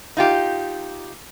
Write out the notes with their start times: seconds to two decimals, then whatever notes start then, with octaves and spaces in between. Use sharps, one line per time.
0.17 D#4 F4 G4